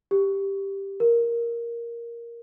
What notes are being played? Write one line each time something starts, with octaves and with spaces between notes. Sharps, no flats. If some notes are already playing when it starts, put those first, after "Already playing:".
G4
A#4